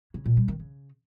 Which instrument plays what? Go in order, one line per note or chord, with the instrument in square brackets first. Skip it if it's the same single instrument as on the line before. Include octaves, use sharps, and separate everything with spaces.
[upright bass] C#3
A#2
G3
D#3
C#3